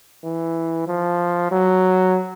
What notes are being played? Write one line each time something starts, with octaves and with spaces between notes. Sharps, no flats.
E3
F3
F#3